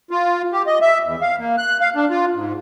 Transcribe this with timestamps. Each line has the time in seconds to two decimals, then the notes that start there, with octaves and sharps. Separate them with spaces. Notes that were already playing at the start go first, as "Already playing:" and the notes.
0.11 F4
0.53 G4
0.67 D#5
0.82 E5
1.03 E2
1.21 F5
1.38 A#3
1.58 F#6
1.81 F5
1.96 D4
2.10 F4
2.34 G#2